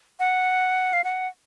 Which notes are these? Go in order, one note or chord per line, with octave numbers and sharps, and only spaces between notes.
F#5
F5
F#5